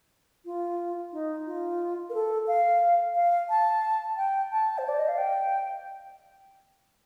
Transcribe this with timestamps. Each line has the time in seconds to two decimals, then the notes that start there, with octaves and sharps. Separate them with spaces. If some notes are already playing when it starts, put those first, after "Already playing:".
0.45 F4
1.12 D#4
1.46 F4
2.10 A#4
2.14 A4
2.47 F5
3.15 F5
3.49 A5
4.17 G5
4.51 A5
4.78 C5
4.88 D5
4.99 D#5
5.08 F5
5.18 G5